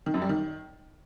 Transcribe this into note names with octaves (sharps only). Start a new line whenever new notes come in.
D#3
F#2
G3
D#3